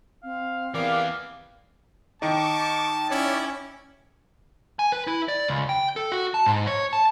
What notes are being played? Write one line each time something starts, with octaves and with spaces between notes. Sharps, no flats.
C4 F5
E3 B3 G4 A#4 D5 F5
D#3 D#4 A5 C#6 D6
C#4 E4 C#5 D5
G#5
B4
E4
D5
C#2
G5
A4
F#4
A5
G#2
C#5
A5